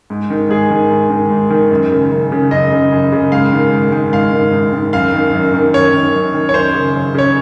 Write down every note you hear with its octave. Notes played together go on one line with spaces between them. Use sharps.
G#2
D#3
G#2 G#4
D#3
G#2
D#3
G#2
D#3
F#2
C#3
F#2
C#3
F#2 D#5
C#3
F#2
C#3
G#2 F5
D#3
G#2
D#3
G#2 F5
D#3
G#2
D#3
F#2 F5
D#3
F#2
D#3
F#2 C#5
D#3
F#2
D#3
C#5
F#2 C5
C#3
F#2
C#3 C#5